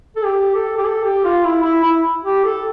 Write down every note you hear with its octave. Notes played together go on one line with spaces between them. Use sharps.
A4
G4
A4
G4
A4
G4
F4
E4
E4
E4
G4
A4